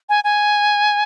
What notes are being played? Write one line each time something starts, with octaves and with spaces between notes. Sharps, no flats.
G#5
G#5